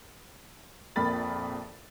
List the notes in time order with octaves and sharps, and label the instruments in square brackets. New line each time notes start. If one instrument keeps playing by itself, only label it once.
[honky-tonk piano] A#1 F2 A#3 A#4 B5 A6